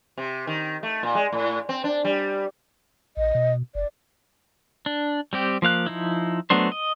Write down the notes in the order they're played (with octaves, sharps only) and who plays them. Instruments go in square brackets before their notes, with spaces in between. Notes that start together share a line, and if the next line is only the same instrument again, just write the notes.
[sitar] C3
D#3
A3
A#2
G#3
A2
C4
D4
G3
[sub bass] A#1 [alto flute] D#5
[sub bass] B2
[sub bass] F#1 [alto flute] D5
[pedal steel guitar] D4
G3 C4 G4
F3 A#3 F5 F#6
F3 D#4 E4
F#3 A3 B3 D4 C5
D#5